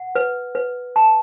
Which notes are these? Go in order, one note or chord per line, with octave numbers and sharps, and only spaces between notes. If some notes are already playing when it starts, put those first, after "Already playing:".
Already playing: F#5
B4
B4
A5